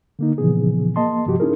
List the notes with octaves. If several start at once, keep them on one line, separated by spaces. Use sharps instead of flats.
D3 A#3 D#4
A#2 C#3 E3 F3 B3 G#4
A#3 D#5 A5 C6
G2 C3 F3 F#4 G4
C#4 D#4 E4 G#4 A#4